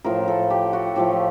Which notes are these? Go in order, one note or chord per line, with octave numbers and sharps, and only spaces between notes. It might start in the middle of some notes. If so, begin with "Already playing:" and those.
A2 F3 A3 A#4
A4
G4
F#4
A2 F3 A3 G4